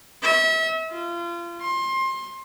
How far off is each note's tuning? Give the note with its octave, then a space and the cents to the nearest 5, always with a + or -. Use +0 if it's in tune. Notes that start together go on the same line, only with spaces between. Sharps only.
E5 -35
F4 -30
C6 +25